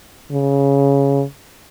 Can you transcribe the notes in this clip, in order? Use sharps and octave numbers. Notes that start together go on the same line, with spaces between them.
C#3